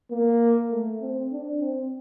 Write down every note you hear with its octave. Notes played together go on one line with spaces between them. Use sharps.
A#3
A3
C4
D4
C4